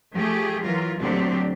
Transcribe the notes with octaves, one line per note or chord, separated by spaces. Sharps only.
F3 A3 G4 G#4
E3 F#3 F4 A#4
D2 A#2 F#3 C4 D4 G4